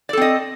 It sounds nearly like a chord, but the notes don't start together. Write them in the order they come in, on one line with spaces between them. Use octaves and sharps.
D5 A4 C4 D#5